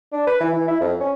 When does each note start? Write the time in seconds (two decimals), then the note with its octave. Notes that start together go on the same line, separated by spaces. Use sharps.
0.12 D4
0.27 B4
0.40 E3
0.54 E3
0.68 E4
0.81 F2
1.00 C#4